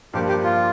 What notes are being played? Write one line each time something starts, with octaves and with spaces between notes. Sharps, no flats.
G2 F3 A#3 G4
G4
F4